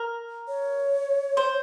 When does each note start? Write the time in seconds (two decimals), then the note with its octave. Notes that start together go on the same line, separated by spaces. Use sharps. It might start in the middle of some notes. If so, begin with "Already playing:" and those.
Already playing: A#4
0.48 C#5
1.37 C5